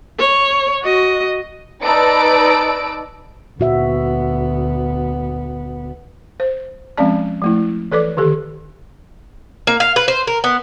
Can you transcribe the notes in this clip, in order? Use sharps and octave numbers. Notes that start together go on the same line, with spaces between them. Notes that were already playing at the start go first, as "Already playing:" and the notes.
C#5
F#4 D#5
D#4 B4 D5 A5 E6 D7
D2 A#2 B3 F#4 E5
C5
F3 G#3 C4 C#4 D5 A5
F3 A3 E4
E3 A4 B4 D5 D6
D3 D#3 G4 A4
A#3
F5
B4
C5
A#4
B3